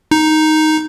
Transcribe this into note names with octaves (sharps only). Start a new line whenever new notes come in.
D#4